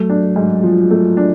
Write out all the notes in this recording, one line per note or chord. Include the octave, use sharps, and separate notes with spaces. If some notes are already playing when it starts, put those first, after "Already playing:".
Already playing: F#3 A3
D4
G#2
F3
A3
D4